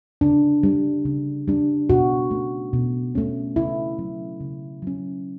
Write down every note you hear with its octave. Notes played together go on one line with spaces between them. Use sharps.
C#3 D4
G3 D4
C#3
G3 D4
B2 F#4
A3 C#4
B2
A3 C#4
C#3 E4
F#3 C#4
C#3
F#3 C#4